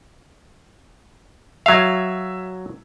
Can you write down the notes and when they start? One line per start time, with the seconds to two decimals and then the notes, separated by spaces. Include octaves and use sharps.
1.66 F#3 E5 F5 G#6